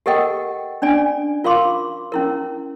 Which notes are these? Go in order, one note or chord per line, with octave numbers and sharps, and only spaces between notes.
G4 A4 A#4 D#5 F#5 G5
C#4 D4 D5 G#5
F4 A#4 F5 C6 D6
C#4 E4 A#4